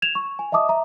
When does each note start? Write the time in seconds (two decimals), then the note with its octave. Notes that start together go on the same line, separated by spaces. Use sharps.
0.02 G#6 E7 F7
0.15 C#6
0.39 G#5
0.52 D#5 E5 A5 D6 D#6
0.69 E5 A#5